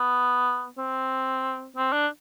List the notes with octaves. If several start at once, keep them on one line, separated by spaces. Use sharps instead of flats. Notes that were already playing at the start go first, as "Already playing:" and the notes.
Already playing: B3
C4
C4
D4